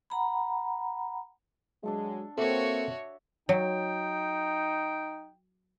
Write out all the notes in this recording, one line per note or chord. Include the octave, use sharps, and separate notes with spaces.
F#5 A#5 B5
F#3 G#3 D4 A4 F5
A#3 C4 F#4 A4 C#5 E5
F#3 D#4 G5